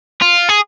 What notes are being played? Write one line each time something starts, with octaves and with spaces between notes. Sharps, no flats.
F4
G#4